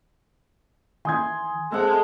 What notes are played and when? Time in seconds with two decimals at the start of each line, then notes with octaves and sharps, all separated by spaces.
1.05 D#3 E3 G#5 C6 D#6 G#6
1.72 G#3 C4 A4 C5 F#5